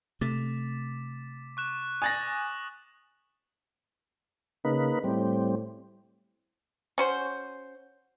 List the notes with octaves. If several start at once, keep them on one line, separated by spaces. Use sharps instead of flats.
C3 A3 D6 A6 B6
C#6 F#6 E7
G#5 D#6 A6 A#6 F#7
C#3 A#3 D#4 B4
A2 G3 C4
C#4 F#4 C5